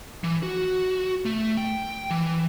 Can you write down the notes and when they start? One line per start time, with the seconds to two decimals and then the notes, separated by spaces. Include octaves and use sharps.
0.24 E3
0.43 F#4
1.25 A3
1.57 G5
2.10 E3